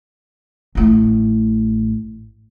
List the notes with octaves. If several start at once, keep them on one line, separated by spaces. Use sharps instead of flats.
A1 A2